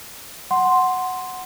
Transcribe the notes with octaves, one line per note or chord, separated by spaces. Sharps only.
F#5 C6